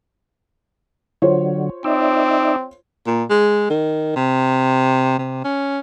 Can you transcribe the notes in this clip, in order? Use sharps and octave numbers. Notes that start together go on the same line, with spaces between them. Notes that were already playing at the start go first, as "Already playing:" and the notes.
D3 F#3 F4 C5 C#5
C4 D#4 D5 E5
A#2
G#3
D#3
C3
C3
C#4